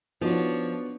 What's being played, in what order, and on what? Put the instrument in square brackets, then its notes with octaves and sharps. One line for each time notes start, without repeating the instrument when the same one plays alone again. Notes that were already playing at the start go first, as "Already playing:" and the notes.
[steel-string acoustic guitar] F3 [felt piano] B3 F#4 [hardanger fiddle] D4 C#5 [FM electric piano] D#4 F4